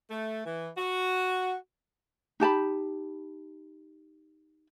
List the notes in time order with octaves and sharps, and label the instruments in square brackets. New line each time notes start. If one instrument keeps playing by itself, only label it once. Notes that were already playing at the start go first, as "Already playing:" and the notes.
[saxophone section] A3
E3
F#4
[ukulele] D#4 G4 A5 B5